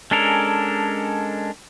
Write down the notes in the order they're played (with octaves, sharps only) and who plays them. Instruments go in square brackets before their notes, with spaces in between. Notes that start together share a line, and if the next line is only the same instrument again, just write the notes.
[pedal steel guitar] G#3 C#4 D4 A4 A#4